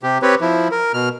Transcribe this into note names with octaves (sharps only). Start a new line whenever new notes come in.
C3 G4
C4 G4 B4 C#5
F3 E4
A#4
B2 F6